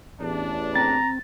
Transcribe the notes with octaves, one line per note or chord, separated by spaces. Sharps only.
A1 E2 D4
C4 A#5 A6